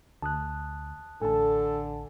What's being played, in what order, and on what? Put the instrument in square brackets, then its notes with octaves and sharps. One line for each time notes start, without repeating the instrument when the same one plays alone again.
[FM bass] D2 [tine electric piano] A5 D#6 F#6
[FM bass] A1 [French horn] D3 [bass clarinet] A4 [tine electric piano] G#5 A5